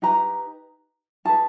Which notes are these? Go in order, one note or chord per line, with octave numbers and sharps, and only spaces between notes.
D#4 G4 B4 A#5
D#4 G#4 B4 A5